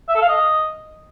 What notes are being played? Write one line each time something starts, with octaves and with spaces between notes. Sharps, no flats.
E5
A4
F5
D#5